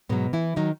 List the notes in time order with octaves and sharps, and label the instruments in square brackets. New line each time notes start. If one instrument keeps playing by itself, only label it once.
[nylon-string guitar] G#2 B2 F#3 B3
E3 E4
D#3 F#3 D#4